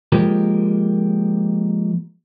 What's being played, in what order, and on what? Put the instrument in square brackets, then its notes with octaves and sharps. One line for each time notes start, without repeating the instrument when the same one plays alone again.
[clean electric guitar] F3 G#3 A#3 G4